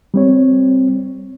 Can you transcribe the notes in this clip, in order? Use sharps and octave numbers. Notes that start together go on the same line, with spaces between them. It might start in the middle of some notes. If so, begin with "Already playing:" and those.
G3 C4 C#5